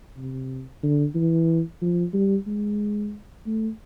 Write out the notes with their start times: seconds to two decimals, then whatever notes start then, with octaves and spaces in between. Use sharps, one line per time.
0.17 C3
0.83 D3
1.15 E3
1.82 F3
2.14 G3
2.47 G#3
3.46 A3